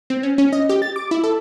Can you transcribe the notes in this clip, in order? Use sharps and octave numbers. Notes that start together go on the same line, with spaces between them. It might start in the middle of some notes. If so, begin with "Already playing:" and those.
C4
C#4
C#4
D#5
G4
A6
D6
E4
A4